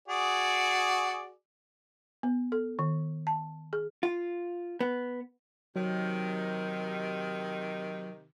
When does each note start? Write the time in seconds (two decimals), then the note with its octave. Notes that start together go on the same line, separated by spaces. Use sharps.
0.08 F#4 G#4 D5
2.23 B3
2.52 A4
2.79 D#3
3.27 A5
3.73 G#4
4.03 F4
4.81 B3
5.76 C3 D#3 F#3